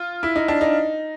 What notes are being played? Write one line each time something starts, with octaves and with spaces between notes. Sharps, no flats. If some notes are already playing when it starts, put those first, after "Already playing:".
Already playing: F4
E4
D#4
D4
D#4